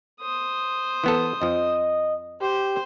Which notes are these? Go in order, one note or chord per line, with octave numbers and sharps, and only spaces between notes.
C5 D#6
E3 B3 A4
F2 F3 D#5
G4 C5